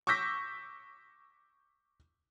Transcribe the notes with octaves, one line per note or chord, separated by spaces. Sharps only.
C#6 D6 E6 G6 A#6 B6